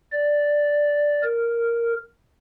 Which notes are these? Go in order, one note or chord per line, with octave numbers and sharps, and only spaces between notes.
D5
A#4